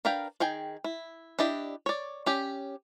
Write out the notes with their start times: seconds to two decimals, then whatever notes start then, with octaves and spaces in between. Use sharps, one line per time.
0.05 D4 A#4 B4 F5 G5
0.40 D#3 G#4 G5 G#5
0.84 E4
1.39 D4 E4 G4 D#5
1.86 C#5 D5
2.26 C#4 G4